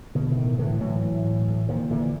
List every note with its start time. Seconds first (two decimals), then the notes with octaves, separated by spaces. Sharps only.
0.15 B2 D3
0.32 E3
0.37 A2 D#3
0.58 A2 D3 E3
0.80 A2 E3 F#3
1.02 A2
1.25 A2
1.48 A2
1.69 A#2 D#3 F3
1.91 A#2 D3 E3